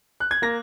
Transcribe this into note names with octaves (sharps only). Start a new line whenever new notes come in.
F#6
G#6
A#3 A#6